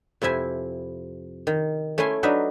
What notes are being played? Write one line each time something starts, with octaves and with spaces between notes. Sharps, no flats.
F2 C3 E4 E5 G#5
D#3
A3 C#4 E4 G#5 C6
F#3 D4 D#4 B4 E5